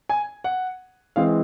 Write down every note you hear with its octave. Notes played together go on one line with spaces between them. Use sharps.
G#5
F#5
E3 G#3 C4 F5